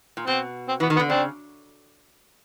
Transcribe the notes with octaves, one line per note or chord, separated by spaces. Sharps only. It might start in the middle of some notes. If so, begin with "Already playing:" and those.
A#2
B2 C4
C4
E3 B3
D#3
B3
D3
C#3 C4 D4